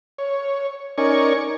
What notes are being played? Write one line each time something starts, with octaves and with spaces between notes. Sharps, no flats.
C#5
C#4 D#4 A#4 D5 G#5 C#6